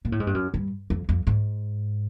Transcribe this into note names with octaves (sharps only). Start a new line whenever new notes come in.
A#2
A2
G#2
G2
F#2
G2
F2
F2
G#2